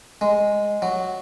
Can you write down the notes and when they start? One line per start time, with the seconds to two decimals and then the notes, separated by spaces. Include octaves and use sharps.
0.21 G#3
0.82 F#3